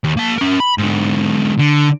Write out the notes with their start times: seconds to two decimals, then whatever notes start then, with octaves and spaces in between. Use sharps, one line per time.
0.04 D#2
0.17 A#3 A5
0.38 C#4 A#4
0.60 B5
0.78 G#2 D3
1.59 D3